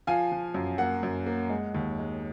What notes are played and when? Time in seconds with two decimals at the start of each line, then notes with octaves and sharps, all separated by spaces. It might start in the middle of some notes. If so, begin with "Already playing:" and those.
0.07 F3 F5 G#5
0.32 F3
0.54 F#2
0.78 A#3 F#5
1.03 F#2
1.26 A#3
1.50 G#3
1.75 D#2
1.98 G#3